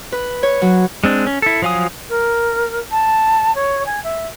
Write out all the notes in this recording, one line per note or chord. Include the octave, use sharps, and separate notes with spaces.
B4
C#5
F#3
G#3 C4 D4
C#4
E4 A4
F3 F#3 F5 G#5 D#6
A#4
A5
C#5
G#5
E5